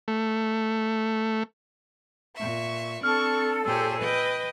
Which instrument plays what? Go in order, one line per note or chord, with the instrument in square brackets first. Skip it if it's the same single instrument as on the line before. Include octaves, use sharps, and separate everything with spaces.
[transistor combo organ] A3
[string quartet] A#2 E5 [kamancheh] C#6
[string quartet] C4 D4 [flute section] A4 [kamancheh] C#6 [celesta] F6
[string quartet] A#2 G#4 C5 [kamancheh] G4 C#5 [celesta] E6
[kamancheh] B4 D#5 [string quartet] G5